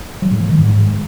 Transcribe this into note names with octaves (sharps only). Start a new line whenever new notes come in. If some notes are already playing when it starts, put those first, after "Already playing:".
F#3
A2
F3
D#3
G#2